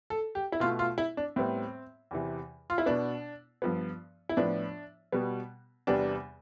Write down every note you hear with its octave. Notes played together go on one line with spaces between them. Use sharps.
A4
G4
E4
B2 A3 F4
F4
E4
D4
A2 G3 B3 C4
E2 C3 E3
F4
E4
B2 B3 D4
G2 F3 B3
E4
A2 F3 B3 D4
B2 G3 B3
E2 C3 G3 B3 D4